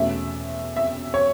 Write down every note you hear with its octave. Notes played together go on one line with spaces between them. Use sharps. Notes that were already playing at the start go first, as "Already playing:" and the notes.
Already playing: E2 B2 A3 C#4 E5
E5
C#5